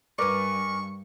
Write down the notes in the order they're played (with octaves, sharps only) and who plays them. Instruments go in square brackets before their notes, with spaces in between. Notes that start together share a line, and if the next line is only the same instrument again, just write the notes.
[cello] G2 [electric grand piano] A#4 B4 D5 [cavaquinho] G#5 D6 [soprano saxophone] C#6